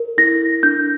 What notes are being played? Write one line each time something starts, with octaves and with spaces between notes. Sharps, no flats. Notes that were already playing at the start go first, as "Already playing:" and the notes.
Already playing: A#4
E4 A#6
D4 G6